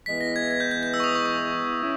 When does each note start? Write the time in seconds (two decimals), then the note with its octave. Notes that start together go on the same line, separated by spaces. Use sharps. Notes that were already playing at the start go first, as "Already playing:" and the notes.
0.06 E3 G#3 B3 E4 B6
0.21 A#6
0.36 G#6
0.51 G#6
0.60 G6
0.71 G6
0.83 G6
0.94 E6
1.00 C#6
1.04 D#6
1.15 C#6
1.26 C#6
1.80 C#4 E4